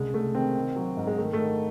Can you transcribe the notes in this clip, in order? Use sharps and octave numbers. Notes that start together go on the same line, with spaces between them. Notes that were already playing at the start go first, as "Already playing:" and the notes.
Already playing: C2 C#3 G#3
C2 A3
D#3 C4
D#3
F#3
G#2
G#3
D#3 A3
D#3 A3